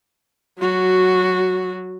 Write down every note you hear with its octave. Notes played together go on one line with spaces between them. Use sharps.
F#3 F#4